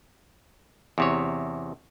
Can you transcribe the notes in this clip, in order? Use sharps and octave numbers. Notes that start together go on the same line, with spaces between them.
E2 C3 C#5